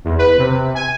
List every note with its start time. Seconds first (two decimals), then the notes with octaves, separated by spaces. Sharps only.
0.05 E2
0.19 B4
0.38 C3
0.75 G#5